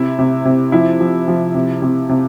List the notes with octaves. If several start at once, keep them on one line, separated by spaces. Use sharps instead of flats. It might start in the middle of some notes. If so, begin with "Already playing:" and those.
Already playing: C3 E4
C3
C3
F3 E4
F3
F3
C3
C3
C3